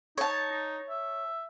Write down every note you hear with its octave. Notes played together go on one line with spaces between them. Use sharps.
D#4 C#5 A5
D#4
E5